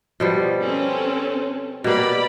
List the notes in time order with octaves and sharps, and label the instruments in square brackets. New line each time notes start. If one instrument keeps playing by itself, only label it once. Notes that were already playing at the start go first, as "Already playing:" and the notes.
[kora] B2 F3 G3
[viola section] C4 C#4 A4
[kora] B2 A#3 [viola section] G4 D5 B5